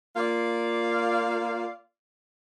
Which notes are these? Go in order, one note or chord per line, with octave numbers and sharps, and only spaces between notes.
A#3 F4 D5 F5